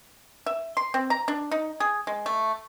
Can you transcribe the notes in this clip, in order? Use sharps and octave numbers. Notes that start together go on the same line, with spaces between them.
E5
C6
C4
A#5
D4
D#4
G#4
G#3
A3